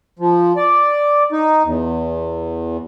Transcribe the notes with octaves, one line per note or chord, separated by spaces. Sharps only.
F3
D5
D#4
E2